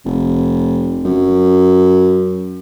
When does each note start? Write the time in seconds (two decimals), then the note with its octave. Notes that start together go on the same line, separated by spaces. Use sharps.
0.05 F1
1.05 F#2